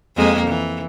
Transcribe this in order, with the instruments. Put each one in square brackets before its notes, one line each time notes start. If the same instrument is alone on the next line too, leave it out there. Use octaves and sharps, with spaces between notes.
[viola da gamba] F2 G#3 A#3
E3